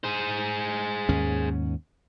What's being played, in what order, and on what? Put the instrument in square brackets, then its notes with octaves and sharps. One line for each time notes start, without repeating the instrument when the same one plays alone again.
[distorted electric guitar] G#4 C5
[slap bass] D#2 G#2 C#4